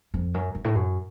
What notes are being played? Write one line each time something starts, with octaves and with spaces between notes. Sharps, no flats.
F2
F#2
F#2
A2
F#2